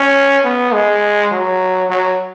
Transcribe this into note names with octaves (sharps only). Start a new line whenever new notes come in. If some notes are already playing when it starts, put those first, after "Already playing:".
Already playing: C#4
B3
G#3
F#3
F#3